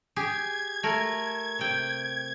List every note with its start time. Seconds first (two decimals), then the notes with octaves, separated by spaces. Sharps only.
0.16 G4 G#4 G#6
0.83 A3 A#4
1.59 C3 G5